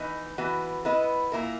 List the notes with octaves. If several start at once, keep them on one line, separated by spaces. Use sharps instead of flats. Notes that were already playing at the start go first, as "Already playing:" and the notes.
Already playing: E3 B3 D#4
E3 B3 F#4
B3 E4 B4 D#5
A#2 A#3 E4 A#4